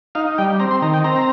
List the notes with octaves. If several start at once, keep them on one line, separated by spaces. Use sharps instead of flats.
D#4 F5
G3 G5
C4 A#5
C6
D#3 A#5
G5
C4 A#5